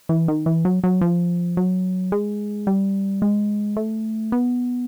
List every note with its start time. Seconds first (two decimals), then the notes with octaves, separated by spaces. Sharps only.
0.09 E3
0.28 D#3
0.46 E3
0.65 F#3
0.84 F#3
1.01 F3
1.57 F#3
2.12 G#3
2.67 G3
3.22 G#3
3.77 A3
4.32 B3